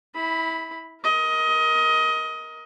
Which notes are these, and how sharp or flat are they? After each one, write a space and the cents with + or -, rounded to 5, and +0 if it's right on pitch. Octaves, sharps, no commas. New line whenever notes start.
E4 -25 B5 +0
A#4 +10 D#5 +20